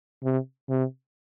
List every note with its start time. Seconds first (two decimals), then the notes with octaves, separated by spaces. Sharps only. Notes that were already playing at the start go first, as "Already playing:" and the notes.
0.24 C3
0.69 C3